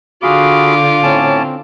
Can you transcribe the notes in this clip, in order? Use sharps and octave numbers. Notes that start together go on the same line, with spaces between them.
D3 F4 F#4 G#4 F5 B5 D6
A2 C4 C#4 A5